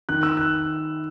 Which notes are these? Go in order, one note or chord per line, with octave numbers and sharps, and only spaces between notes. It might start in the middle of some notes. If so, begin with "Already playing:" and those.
D#3 F#6
E6
F#6